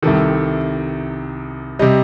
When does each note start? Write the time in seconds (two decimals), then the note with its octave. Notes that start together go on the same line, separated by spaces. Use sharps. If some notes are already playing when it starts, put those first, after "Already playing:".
0.03 C2 C3 D#3 A4
1.79 C3 G3 D#5